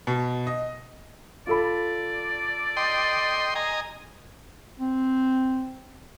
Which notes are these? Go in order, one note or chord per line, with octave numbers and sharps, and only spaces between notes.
B2
D#5
F4 A4 D5 B5
D#5 G5 C6
D#5 G#5 A#5
C4